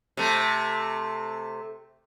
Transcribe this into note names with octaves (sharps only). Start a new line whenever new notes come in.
C3 A3